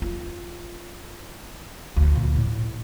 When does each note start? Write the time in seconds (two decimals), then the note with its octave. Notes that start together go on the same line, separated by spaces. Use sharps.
0.02 F4
1.96 D2
2.15 A#2
2.36 A2